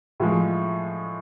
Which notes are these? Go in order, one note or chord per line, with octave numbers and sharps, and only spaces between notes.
A2 F3 G#3